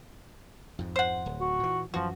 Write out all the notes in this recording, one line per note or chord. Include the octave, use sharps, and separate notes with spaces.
F2 G#2
C5 F#5
D1
F#4
A#2 E3
F#2 E3 F3 F#4